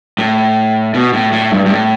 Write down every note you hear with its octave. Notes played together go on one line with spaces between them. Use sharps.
A2
B2
A2
A2
G2
G2
A2